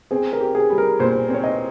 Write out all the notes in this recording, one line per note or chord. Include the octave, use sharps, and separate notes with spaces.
C4 G#4
A#4
G4
G#4
G3
A#4
A#2 C5
C4
C#5
D#5